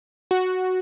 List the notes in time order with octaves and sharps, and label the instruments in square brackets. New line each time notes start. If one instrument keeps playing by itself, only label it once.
[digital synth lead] F#4